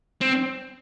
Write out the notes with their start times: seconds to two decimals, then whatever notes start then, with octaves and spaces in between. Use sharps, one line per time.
0.21 C4